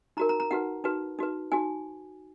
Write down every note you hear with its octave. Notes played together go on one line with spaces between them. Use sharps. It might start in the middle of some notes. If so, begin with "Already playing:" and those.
D#4 F#4 A#4 A#5
A#5
A#5
D#4 F#4 B4 F#5
D#4 F#4 B4
D#4 F#4 B4
D#4 F#4 G#5